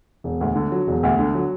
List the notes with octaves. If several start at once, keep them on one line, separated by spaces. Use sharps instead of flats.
E1
D2
D3
F#3
E1
D2
D3
F#3